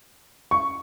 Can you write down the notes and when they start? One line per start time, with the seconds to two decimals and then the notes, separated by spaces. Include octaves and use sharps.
0.51 C#6